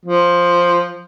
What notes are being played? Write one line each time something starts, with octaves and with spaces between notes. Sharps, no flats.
F3